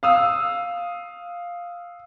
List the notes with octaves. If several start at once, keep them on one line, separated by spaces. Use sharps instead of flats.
F5 D#6 E6